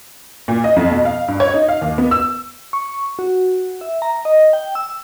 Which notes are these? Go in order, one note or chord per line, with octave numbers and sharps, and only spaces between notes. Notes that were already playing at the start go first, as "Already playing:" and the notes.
A#2
D#5
F2
B2
F5
G2
C#5
D#4
F5
D#2
B3
E6
C#6
F#4
E5
A#5
D#5
G5
E6